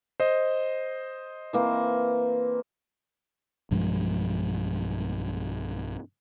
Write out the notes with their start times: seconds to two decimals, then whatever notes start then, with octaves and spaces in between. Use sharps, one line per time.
0.20 C5 D#5
1.53 E3 A#3 C4
3.71 B1 G2 F3 G#3